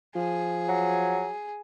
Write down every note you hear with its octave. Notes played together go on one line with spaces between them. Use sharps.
F3 G#4
F#3